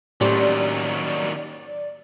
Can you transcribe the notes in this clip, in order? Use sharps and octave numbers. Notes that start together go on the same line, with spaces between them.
D#2 A2 F#3 C#4 G4 C5 D5